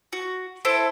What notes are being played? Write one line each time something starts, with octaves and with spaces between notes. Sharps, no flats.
F#4
E4 A4 C5